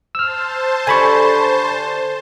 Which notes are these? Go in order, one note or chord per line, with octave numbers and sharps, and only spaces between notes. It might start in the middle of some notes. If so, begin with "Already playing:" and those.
C5 A5 E6 F6
D3 G3 G#5 B5 C#6